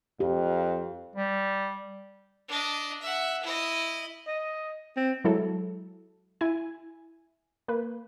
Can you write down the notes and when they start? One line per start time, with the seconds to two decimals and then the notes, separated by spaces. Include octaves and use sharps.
0.20 F2 G4
1.16 G3
2.48 D4 D#5
3.02 E5 F#5
3.43 E4 D#5
4.27 D#5
4.96 C4
5.24 F#3 G#3 E4 A4
6.41 E4 G#5
7.68 A#3 B4